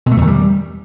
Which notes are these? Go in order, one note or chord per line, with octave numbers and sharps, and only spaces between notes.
B2
A3
E2
D#3
G3